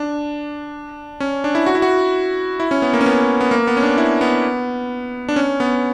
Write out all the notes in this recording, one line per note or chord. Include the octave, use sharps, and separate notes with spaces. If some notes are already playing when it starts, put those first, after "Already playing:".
Already playing: D4
C#4
D4
E4
F#4
E4
F#4
E4
C#4
B3
A#3
C#4
B3
B3
A#3
B3
C#4
D4
E4
B3
D4
C#4
B3